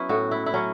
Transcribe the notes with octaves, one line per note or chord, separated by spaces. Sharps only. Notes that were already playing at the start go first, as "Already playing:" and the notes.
Already playing: F#3 B3 C#4 E4
A2 F#4
E4
E4
F#3 C#4